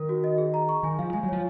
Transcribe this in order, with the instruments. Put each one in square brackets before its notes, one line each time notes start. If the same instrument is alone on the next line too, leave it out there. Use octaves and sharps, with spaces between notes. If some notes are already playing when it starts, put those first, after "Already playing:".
Already playing: [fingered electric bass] D#3 [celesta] A#4
[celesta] F#4
D#5
G#4
A#5
C#6
[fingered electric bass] D#3 [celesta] G#5
[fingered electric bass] F3 [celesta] F5
[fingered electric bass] G#3 [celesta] G#5
[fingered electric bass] F#3
[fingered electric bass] F3 [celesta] C#5